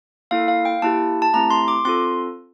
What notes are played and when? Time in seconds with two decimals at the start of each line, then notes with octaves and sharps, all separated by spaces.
0.31 A#3 E4 A4 F5
0.48 F5
0.65 G5
0.82 A#3 E4 G4 A5
1.22 A5
1.34 A3 C4 E4 G4 A#5
1.50 C6
1.68 D6
1.85 C4 F4 A4 C6